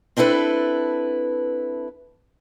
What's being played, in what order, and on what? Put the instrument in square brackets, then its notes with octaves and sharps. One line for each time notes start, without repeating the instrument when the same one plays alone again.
[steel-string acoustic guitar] C4 D4 E4 A4 B4